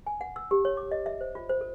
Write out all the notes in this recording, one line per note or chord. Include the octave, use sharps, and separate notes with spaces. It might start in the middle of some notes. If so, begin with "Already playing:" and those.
G#5
F#5
E6
G4
C#5
D6
D#5
E5
C5
F4
C5
A4